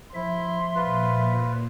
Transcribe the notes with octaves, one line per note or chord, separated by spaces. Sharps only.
F3 E4 E5 C6
A#2 F4 B4